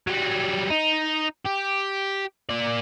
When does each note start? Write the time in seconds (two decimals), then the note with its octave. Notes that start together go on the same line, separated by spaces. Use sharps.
0.07 F#3 G3
0.70 D#4
1.45 G4
2.49 A#3 D5